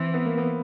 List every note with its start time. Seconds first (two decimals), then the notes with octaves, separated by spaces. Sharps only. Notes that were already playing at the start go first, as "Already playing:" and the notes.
Already playing: E3 C4
0.14 B3
0.25 A#3
0.38 B3